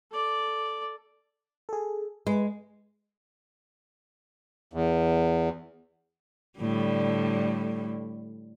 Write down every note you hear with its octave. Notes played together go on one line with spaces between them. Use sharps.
A4 D5
G#4 A4
G#3 B4
E2
A2 D3 G3